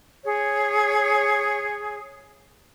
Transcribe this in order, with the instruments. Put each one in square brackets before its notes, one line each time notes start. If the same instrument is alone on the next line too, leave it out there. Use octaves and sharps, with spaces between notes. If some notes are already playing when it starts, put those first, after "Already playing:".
[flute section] G#4 C#5